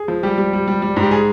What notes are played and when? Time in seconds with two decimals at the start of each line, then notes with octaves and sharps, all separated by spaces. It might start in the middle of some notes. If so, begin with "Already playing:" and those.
Already playing: G#4
0.08 F3
0.23 G3 G4
0.38 G3
0.53 G3
0.67 G3
0.82 G3
0.96 G#2
1.03 G4
1.11 G#4